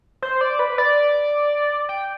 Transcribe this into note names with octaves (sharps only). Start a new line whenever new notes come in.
C5
D5
B4
D5
G5